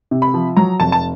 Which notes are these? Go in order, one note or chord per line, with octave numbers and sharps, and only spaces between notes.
C3
B5
F3
F#3 A#5
F1 A5
A5